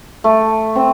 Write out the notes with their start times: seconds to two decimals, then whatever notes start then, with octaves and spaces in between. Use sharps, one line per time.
0.24 A3
0.75 C4